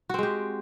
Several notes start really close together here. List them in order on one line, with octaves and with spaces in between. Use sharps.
F#4 C4 G#3 G4